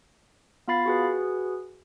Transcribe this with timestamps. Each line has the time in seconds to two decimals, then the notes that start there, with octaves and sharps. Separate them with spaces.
0.68 B3 F4 F5 B5 A6 C7
0.86 F#4 G#4 B4